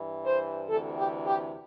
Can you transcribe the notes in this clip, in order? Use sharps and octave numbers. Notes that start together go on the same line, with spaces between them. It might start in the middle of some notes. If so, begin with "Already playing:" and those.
Already playing: G2 E3
C5
D2 C3 E3 A4
G4
G4